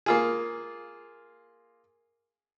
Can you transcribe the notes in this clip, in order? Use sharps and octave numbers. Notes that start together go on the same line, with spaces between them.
A#3 F4 G#4